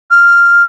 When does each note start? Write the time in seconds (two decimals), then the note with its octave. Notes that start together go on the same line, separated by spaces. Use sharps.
0.11 F6